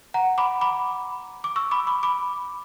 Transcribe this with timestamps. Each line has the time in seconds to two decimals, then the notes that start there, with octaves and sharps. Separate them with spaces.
0.14 F#5 A#5
0.38 B5 D6
0.61 B5 D6
1.44 D6
1.56 C#6 E6
1.71 B5 D6
1.87 B5 D6
2.03 B5 D6